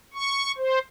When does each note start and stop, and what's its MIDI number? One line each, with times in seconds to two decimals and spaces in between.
0.14 0.52 85
0.57 0.79 72